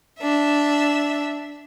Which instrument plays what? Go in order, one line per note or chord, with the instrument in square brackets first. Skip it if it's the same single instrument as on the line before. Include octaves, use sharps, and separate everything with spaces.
[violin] D4 E5